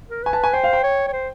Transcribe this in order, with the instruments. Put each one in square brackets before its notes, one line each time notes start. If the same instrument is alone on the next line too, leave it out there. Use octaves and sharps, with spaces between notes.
[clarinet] A#4
[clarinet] B4 [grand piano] G#5
[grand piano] A5
G#5
[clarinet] C5 [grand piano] G5
[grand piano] F5
G5
[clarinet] C#5
C#5
C5